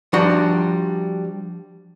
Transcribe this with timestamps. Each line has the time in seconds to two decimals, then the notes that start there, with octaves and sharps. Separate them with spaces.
0.13 F3 G3 D4 F#4 C6